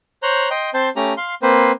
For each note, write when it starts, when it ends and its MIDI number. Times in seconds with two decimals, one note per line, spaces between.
0.23 0.49 72
0.23 0.49 73
0.23 0.49 82
0.23 0.49 90
0.23 0.49 91
0.50 0.70 75
0.50 0.70 79
0.50 0.70 84
0.74 0.89 60
0.74 0.89 72
0.74 0.89 81
0.74 0.89 84
0.74 0.89 91
0.96 1.13 57
0.96 1.13 61
0.96 1.13 67
0.96 1.13 82
1.17 1.35 77
1.17 1.35 84
1.43 1.72 58
1.43 1.72 60
1.43 1.72 71
1.43 1.72 72